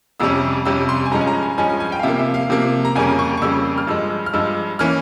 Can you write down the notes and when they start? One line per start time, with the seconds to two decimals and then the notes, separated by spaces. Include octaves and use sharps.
0.20 F2 C3 G3 C#4 E6
0.65 F2 C3 G3 C#4 E6
0.89 C6
1.06 G#5
1.11 G2 F3 G#3 C#4 A#5
1.21 G#5
1.27 A#5
1.43 G#5
1.58 G2 F3 G#3 C#4 G#5
1.69 G#5
1.80 G#5
1.92 G5
1.99 F5
2.03 C3 F3 A#3 E5
2.19 E5
2.34 F5
2.50 C3 F3 A#3
2.85 A#5
2.95 F2 C#3 G3 A#3 C#4 G#5
3.19 C#6
3.37 C#6
3.42 F2 C#3 G3 A#3 C#4 E6
3.78 F6
3.87 G2 F3 G#3 E6
4.26 F6
4.33 G2 F3 G#3 E6
4.79 E3 A#3 C#4 F6